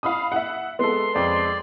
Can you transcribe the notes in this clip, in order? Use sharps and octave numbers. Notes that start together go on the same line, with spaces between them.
F5 B5 D#6
E5 F#5
G#3 B3 A4 C6
F2 G#3 D5